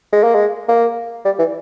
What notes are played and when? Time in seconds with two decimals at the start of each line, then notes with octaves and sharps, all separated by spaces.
0.12 G#3
0.24 A#3
0.35 G#3
0.68 A#3
1.25 G3
1.39 E3